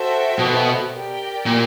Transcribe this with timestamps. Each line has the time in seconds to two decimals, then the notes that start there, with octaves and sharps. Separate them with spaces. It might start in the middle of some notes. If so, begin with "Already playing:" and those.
Already playing: F#4 A4 C5 E5 G5
0.39 B2
0.91 G4 A#4 D5 G5
1.46 A#2